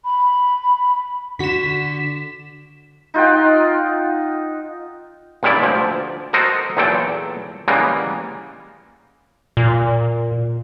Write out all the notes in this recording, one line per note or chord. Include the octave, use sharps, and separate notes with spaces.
B5
D3 F#4 B6 E7
D#4 F4 F#5 G5
C#2 A#2 D#3 G3 E4 D5
D2 F3
F#4 A4 A#4 C5 D#5
E2 A#2 F#3 A4 G5
C#3 E3 G3 G#3 A#3 B3
A#2